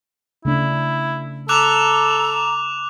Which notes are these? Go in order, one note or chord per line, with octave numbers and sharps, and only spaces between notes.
C#3 A3 D4 E4
A4 A#5 D6 F#6 F7